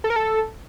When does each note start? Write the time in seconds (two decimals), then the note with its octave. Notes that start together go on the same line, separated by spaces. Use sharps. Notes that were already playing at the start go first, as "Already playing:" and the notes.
0.04 A4
0.10 A#4
0.16 A4